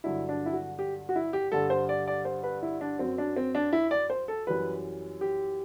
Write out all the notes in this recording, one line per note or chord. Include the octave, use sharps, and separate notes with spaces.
G2 D3 F#3 E4
D4
E4
F#4
G4
F#4
E4
G4
G2 D3 G3 A4
C5
D5
D5
C5
B4
E4
D4
F#2 F#3 C4
D4
C4
D4
E4
D5
C5
A4
F#2 E3 G3 B4
G4